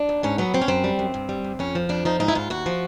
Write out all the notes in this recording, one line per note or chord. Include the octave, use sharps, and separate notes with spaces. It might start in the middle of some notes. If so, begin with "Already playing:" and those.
Already playing: D4
D#2
G#2 C#4
F#3 B3
G#2 C4
C#4
F#2 C4
G3
F#2
G2
G3
G2
F2 C#4
F3
F2 D4
F3 D#4
G#2 D#4
E4
G#2 F4
D#2 F#4
F3